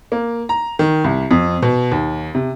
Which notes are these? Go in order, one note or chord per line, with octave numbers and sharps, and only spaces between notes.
A#3
A#5
D#3
C2
F2
B2
D#2
C3